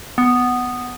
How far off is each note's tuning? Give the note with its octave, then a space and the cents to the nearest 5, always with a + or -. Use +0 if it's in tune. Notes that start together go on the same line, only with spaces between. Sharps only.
B3 +5